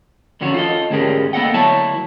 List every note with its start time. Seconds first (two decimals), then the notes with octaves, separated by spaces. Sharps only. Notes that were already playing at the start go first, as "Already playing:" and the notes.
0.41 F2 D3 C#4 F#4 C#5
0.54 F4 A4 D#5
0.90 D2 G#2 C#4 G4 G#4 A#4
1.33 A#3 B3 A4 D#5 F#5 G5
1.54 D2 F#3 E4 C#5 A5